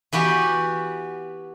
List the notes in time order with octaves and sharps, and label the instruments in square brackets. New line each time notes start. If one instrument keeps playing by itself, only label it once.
[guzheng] E3 B3 F#4 G4